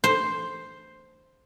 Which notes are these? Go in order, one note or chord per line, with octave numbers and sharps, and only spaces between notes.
C5